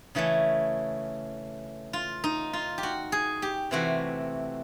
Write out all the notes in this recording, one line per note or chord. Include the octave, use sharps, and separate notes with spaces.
C#3 E3 A3 C#4
F4
D#4
F4
G4
F#4
G#4
G4
C3 E3 A3 C4 F#4